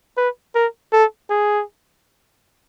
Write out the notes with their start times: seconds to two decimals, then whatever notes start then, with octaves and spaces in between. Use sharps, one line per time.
0.18 B4
0.55 A#4
0.93 A4
1.30 G#4